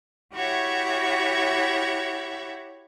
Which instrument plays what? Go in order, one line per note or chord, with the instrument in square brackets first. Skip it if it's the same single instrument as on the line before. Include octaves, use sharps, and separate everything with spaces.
[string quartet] E4 F#4 G4 C#5 E5 F#5